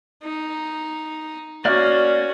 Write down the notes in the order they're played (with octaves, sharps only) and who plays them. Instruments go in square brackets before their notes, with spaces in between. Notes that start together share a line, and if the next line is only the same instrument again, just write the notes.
[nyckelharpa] D#4
[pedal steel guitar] A#3 D5 F6 [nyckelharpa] C#4 F#4